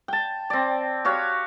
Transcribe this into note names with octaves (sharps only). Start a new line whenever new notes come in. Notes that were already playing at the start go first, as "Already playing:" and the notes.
G5 A5
C4 D5
F#4 G4 C#5 F5